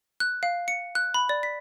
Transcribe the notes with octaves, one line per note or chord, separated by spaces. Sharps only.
F#6
F5
C#7
F#6
B5
D5
B6